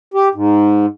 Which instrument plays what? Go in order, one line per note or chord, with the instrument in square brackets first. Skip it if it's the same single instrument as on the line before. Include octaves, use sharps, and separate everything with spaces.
[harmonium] G4
G#2